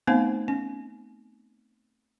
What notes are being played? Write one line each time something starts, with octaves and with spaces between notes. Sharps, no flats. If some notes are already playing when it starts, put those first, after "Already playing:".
A3 B3 C4 D#4 C5 F5
C#4